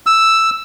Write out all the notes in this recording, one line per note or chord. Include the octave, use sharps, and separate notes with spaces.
E6